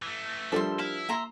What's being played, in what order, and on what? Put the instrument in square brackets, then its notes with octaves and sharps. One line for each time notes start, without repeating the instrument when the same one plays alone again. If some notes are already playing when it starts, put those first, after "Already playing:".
[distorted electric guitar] E3 A3
[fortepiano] F3 G3 [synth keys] D4 G4 A#4 [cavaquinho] A4 E5 C6
[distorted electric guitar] E4 [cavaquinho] F5
[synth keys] A#3 [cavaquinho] E5 A#5 C6